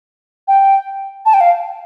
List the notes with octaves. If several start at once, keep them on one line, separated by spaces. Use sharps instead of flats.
G5
A5
G5
F5